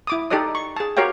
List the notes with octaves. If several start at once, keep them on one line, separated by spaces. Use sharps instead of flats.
E4 D6 D#6
D#4 G4 A4 D5 D#5 D#6
C#6
G#4 A5
F#4 G4 A#4 C#5 F5 G5